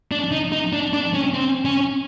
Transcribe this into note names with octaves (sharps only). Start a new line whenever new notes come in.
D4
D#4
D#4
D4
D4
C#4
C4
C#4